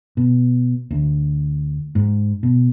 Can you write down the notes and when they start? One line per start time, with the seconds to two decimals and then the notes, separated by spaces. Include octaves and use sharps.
0.17 B2
0.91 D2
1.95 G#2
2.43 B2